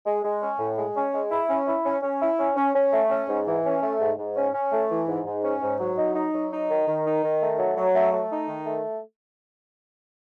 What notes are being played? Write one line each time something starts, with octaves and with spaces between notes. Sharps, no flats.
G#3
G#3
C#4
A2
G#3
C#4
G#3
E4
C#4
E4
C#4
C#4
E4
C#4
C#4
C#4
A3
C#4
G#2
E3
C#4
A3
G#2
G#2
C#4
C#4
A3
E3
G#2
G#2
C#4
G#2
F#3
D#4
D#4
F#3
D#4
D#3
D#3
D#4
D#3
A3
F#3
F#3
A3
A3
D#4
D#3
A3